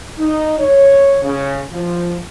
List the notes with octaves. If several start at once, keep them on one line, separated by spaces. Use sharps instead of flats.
D#4
C#5
C#3
F3